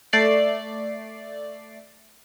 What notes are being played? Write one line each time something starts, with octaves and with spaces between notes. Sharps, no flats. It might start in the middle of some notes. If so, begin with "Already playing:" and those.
A3 D5 C7